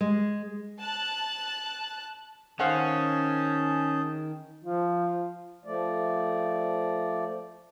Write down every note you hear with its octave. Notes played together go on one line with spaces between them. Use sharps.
G#3
A5 F#6
D#3 C#4 G#4 C5 F5 F#5 A5 G6
F3 F4
F3 A3 D5